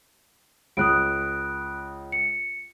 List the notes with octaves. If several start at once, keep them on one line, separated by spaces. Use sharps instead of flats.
C#2 D#6 F#6 D7
C#7